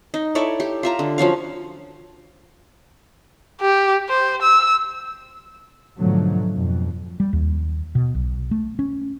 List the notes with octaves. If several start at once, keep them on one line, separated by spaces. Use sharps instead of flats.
D#4
E4 A4 C#5 D5
G4
F4 E5 A#5
D3
F3 F#3 C#4 F5
G4
C5
E6
G#2 B2 D3 F3 F#3 A3
F2 B2
G3
D#2
B2
B1
A3
C#4